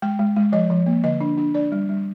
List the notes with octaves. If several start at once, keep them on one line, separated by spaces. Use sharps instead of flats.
G#3 G5
G#3
G#3
F3 D#5
F3
A#3
D3 D#5
D4
D4
D4 D5
G3
G3